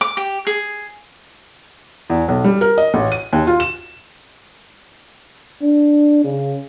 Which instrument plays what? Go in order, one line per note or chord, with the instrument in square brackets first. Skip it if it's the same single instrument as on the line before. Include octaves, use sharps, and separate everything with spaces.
[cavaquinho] D6
G4
G#4
[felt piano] E2
B1
G3
A#4
D#5
A1
D#7
D#2
F4
E7
[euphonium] D4
C#3